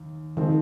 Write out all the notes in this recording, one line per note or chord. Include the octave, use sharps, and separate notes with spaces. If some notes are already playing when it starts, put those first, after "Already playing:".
Already playing: D#2
D#3 F3 G#3 C4